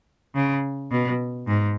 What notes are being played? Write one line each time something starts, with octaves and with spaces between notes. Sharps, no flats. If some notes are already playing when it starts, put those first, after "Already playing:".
C#3
B2
G#2